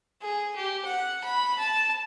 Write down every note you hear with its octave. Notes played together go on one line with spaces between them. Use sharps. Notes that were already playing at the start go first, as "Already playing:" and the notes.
G#4
G4
F#5
B5
A5